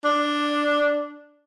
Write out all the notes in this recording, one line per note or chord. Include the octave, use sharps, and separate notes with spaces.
D4